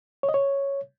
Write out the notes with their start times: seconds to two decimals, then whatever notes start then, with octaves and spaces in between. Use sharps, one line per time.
0.23 C#5
0.29 D#5
0.34 C#5